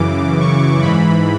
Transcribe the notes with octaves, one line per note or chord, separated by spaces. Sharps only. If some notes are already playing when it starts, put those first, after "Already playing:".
Already playing: F#2 C#3 E3 D6
C#6
G#2 E3 B5